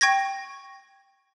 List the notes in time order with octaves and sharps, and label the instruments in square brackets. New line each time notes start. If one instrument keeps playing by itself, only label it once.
[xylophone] G5 C#6 G#6 A#6